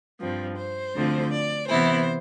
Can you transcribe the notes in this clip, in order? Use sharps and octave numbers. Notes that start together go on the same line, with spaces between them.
G2 F3 C4
C5
D2 D3 F3 C4
D5
C3 E3 B3 E4 C5